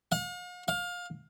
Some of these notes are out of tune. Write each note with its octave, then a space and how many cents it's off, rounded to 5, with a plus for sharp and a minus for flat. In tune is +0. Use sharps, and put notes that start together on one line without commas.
F5 +45
F5 +25